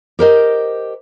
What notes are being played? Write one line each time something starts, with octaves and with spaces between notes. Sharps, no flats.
G4 A#4 C5 D#5